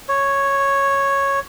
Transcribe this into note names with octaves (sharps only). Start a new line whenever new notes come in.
C#5